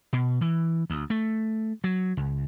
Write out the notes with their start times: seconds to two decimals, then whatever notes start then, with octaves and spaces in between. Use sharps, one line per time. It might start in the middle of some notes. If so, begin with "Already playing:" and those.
0.13 B2
0.41 E3
0.90 D2
1.10 A3
1.84 F#3
2.17 C#2